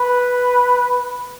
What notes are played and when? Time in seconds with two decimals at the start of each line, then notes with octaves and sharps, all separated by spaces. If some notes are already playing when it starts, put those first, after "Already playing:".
Already playing: B4